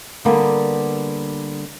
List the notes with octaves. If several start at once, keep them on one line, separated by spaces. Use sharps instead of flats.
D3 G3 A#3 B3